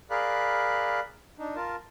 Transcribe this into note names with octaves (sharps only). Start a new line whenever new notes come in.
G#4 A#4 D5 F5 B5 F#6
D4 D#4
F4 A#4 A5